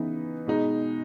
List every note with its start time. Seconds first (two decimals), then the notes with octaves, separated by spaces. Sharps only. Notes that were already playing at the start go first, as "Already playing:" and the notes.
Already playing: C#3 E3 B3 D#4
0.47 B2 G#3 D#4